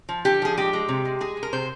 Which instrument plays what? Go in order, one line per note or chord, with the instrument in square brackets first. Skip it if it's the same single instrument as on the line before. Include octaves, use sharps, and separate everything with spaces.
[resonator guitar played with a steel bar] F3
D3 G4
F3 G#4
G#3 G4
G#3
C3
G#3
G#3 G#4
G#3
A#4
C3 C5